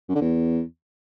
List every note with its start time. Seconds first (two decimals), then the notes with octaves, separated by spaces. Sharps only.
0.09 F#2
0.15 D3
0.21 E2